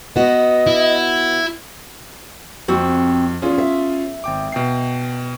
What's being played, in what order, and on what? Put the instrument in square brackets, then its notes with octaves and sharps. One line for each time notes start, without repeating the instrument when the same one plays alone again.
[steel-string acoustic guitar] B3 F#4 [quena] D#5
[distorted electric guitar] E4
[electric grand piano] F2 [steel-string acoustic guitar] C4 F#4
[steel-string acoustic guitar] E2 [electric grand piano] C#4 F4 G#4
[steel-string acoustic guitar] E5
[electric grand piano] G#1 G5 D6
B2 G5 C7